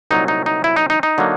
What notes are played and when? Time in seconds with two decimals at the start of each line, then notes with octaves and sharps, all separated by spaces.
0.11 C2 A#2 F#3 D#4
0.28 D#4
0.46 D#4
0.64 E4
0.76 D#4
0.90 D#4
1.03 D#4
1.18 D3 F#3 A#3